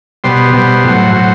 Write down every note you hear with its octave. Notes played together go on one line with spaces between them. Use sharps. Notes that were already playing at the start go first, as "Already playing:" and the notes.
B2 G3 C5
B2 G3
A2 F#3
A2 F#3